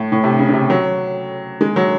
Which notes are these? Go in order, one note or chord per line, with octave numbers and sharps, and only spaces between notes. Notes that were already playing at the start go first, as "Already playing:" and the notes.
Already playing: A2
A2
C3
C#3
C#3
C3
F#3
G#3
F#3